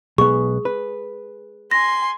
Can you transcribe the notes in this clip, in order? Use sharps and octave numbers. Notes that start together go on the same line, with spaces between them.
B1 B3 G#4 C#6
B4
G#5 C6 A#6